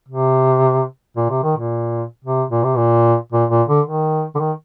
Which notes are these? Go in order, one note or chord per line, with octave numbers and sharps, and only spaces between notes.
C3
A#2
C3
D#3
A#2
C3
A#2
C3
A#2
A#2
A#2
D3
D#3
D3
D#3